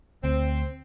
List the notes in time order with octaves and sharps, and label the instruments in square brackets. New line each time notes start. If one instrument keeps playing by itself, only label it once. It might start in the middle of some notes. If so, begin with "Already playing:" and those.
[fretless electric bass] D2 [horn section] C4